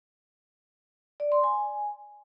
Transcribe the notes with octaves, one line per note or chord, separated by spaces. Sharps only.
D5
C6
G#5